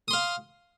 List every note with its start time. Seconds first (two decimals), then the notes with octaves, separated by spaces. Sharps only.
0.08 D#6
0.11 C6
0.13 F5